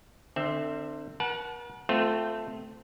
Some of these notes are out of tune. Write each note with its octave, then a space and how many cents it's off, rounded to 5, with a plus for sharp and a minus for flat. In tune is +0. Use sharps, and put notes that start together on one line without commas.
D3 +35 C4 +0 E5 +0
A#4 +45 F#5 +0 A5 -25
A3 +0 C4 -20 F4 +5